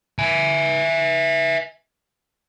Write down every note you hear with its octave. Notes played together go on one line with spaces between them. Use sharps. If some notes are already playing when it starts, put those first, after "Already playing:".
E5 G#5